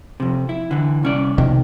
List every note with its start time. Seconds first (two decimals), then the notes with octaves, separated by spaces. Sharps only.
0.20 F2 C3
0.49 E4
0.71 D3 E3
1.03 C2 C#4 D5
1.38 B1 F2 C3 D#3